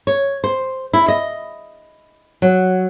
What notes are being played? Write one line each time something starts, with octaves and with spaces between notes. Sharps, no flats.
C#5
C5
E4
D#5
F#3